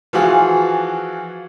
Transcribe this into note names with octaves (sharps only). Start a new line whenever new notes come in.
E3 F3 F4 F#4 G#4